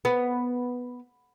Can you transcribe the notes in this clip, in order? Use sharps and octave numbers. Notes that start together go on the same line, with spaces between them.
B3